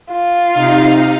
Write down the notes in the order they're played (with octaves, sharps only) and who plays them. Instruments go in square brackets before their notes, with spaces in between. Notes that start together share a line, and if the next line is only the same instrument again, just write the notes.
[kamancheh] F4
[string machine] C3 D#4 F5